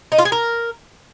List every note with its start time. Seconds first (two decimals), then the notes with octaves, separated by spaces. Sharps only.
0.12 D#4
0.19 F4
0.25 G#4
0.32 A#4